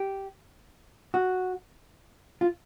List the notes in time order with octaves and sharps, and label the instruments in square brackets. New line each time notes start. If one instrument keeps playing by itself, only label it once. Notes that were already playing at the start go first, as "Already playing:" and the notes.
Already playing: [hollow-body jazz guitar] G4
F#4
F4